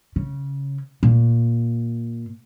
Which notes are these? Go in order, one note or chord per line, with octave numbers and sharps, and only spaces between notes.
C#3
A#2